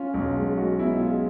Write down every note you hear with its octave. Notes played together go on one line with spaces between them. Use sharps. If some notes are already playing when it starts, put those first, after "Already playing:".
Already playing: C#4 F4
B1
G#3
G#3 F#4
B2 E4
G#3 F4